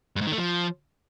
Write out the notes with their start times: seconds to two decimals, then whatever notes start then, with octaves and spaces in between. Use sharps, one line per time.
0.16 G2
0.21 G#2
0.27 D#3
0.32 A3
0.38 F3